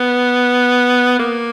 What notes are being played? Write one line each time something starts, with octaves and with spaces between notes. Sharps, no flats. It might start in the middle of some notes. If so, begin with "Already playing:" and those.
Already playing: B3
A#3